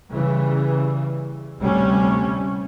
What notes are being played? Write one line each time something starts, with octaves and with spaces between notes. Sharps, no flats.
C#3 E3 G3
D2 A2 C3 G3 A3 C#4